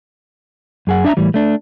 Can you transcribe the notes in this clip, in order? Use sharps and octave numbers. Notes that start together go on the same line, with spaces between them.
F#2 G#4 F#5
D4 E5 A5 A#5
A2 E3 G3
A3 D4